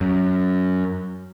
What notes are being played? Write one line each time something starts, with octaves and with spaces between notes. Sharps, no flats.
F#2